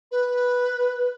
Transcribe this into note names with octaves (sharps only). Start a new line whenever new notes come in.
B4